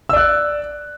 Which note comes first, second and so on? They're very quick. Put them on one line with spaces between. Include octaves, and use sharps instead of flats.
E6 D5 F#6